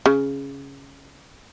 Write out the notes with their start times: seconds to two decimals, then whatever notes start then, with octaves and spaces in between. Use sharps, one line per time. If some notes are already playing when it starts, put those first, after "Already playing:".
0.06 C#3